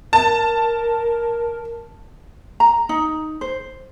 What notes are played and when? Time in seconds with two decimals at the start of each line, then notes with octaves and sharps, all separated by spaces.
0.13 A#4 A5
2.60 A#5
2.89 D#4
3.41 C5